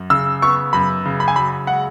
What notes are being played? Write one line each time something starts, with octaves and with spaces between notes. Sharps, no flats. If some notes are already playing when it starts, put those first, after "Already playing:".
Already playing: F#2
C#3 E6
B3 C#6
F#2 B5
C#3
B5
G#5
F#3 B5
G#3 F#5